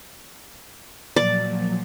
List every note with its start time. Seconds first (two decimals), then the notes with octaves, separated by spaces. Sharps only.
1.16 A#2 F3 F#3 D5